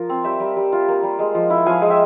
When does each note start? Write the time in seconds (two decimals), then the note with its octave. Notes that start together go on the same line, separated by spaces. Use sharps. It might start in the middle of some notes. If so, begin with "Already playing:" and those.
Already playing: F3 F4 A#4
0.09 C4
0.24 G3 C5 E5
0.40 G3
0.57 G3
0.73 F4
0.88 A#3
1.03 G3
1.19 G#3
1.35 F3
1.50 E4
1.66 F3 F5 G#5
1.82 G#3
1.90 E5 G5